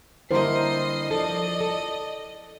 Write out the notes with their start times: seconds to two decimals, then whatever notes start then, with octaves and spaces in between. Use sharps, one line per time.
0.31 D3 G3 A#3 E4 A#4 C5 D#5 C7
1.11 F3 A4 D5 D#5
1.61 A4